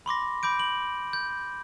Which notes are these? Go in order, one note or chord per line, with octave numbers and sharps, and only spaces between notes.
B5 C6 D6 A#6
B5 D6 G6 D7
F#7
G6